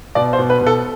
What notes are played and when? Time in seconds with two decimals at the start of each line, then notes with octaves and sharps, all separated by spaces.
0.15 B2 D5
0.33 C5
0.39 B2
0.50 B4
0.61 B2
0.67 A4